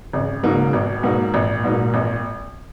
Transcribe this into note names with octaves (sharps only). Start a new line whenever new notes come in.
G#1 C#3
G#2 C#3 F#3 A#3 D#4
C#3
G#1 B2
G#2 F#3 A#3 D#4
G#1 A#2
G#2 F#3 A#3 D#4
G#1